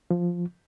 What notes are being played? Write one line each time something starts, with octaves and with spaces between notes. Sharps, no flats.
F3